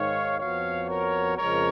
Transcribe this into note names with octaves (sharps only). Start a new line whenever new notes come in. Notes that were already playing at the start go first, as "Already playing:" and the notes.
Already playing: G#2 D#3 G#3 C#5 F5
F2 F3 B3 F#4 C#5 F5
A#4 C#5
F2 C#3 F3 G#3 A#4 C#5